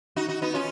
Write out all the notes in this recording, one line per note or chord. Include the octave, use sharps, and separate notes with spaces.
D#4 F#4
D#4 F#4
B3 D#4
C#4 F4